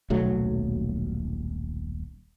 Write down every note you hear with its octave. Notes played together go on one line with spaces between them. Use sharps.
D#1 B1 F#3 A3